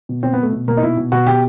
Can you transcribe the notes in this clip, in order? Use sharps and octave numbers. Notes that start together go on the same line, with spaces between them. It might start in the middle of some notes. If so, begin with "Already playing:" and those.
B2
B2 C4
B3
B2
A3
B2
B2 A#3
D#4
B2 E4
B2
B2 F#4
B2 G4